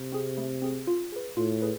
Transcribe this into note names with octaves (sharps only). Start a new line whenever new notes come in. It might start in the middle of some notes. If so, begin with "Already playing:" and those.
Already playing: C3
C4 G#4
A3
C4 G#4
F4
G#4 B4
A2 F4
G#4 B4